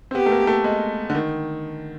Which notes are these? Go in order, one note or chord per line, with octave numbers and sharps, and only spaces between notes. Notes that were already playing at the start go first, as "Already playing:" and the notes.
C4
B3 G4
A3
A#3
A3
G#3
D3
D#3